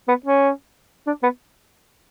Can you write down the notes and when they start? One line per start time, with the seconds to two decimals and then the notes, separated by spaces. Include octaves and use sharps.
0.08 B3
0.26 C#4
1.07 D4
1.23 B3